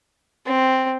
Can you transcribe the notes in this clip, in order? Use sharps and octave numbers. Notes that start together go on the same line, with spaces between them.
C4